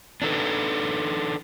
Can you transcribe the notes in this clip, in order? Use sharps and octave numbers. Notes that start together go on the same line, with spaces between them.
D4 D#4 A4 B4